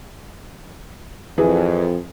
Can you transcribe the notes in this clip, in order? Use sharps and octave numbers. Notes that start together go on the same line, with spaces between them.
F2 E3 G#4